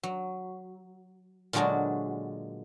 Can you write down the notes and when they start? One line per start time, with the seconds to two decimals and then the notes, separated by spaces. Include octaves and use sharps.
0.03 F#3
1.53 A#2 D3 F#3 G#3 D4 F#4